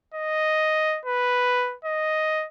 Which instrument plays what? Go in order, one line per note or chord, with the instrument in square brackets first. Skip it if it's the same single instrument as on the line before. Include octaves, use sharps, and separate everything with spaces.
[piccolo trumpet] D#5
B4
D#5